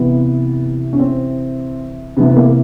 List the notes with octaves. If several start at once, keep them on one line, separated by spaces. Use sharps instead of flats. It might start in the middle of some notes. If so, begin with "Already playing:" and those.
Already playing: C3 E3 B3
C#4
C4
C3 E3 B3
B3
A#3